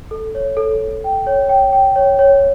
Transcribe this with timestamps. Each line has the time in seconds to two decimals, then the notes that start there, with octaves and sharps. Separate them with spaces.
0.11 A4
0.35 C#5
0.57 A4
0.80 A4
1.04 G5
1.27 C#5
1.49 G5
1.73 G5
1.96 C#5
2.19 C#5